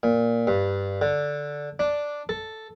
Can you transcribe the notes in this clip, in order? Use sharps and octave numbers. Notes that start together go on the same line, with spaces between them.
A#2
G2
D3
D4
A4